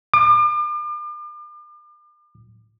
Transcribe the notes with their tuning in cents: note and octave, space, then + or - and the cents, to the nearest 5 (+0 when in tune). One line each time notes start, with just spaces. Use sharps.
D6 +40